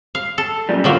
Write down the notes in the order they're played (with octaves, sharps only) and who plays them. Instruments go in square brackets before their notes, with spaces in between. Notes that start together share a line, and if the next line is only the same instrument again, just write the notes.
[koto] F5
A4
[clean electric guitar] F#2 A#2 G3
[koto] D3 F#3 A#3 [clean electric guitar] C4 F4